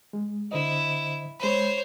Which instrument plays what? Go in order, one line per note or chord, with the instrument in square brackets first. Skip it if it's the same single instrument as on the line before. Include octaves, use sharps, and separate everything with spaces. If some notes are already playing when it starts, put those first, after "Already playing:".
[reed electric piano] G#3
[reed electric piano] D3 C5 D#5 [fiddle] E4
[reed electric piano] G#3 B5 [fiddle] C5 C#5